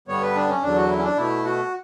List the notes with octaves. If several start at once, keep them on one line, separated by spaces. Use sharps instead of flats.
G2 D3 G3 B3 C#5
B4
D4
C#4
E2 D3 F#3 D4
F#4
E4
C#4
D4
B2 A3 E4
F#4